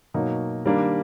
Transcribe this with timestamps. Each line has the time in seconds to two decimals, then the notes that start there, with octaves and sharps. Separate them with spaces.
0.14 B2 F#3 A#3 D#4
0.65 D#3 G3 A#3 D4